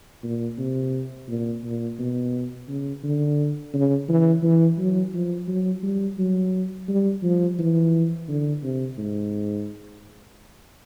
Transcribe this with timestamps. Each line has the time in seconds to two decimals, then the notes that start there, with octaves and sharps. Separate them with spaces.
0.23 A#2
0.58 C3
1.28 A#2
1.64 A#2
1.99 B2
2.68 C#3
3.03 D3
3.73 C#3
4.08 E3
4.43 E3
4.78 F#3
5.14 F3
5.48 F#3
5.83 G3
6.18 F#3
6.88 G3
7.23 F3
7.58 E3
8.28 D3
8.63 C3
8.98 G#2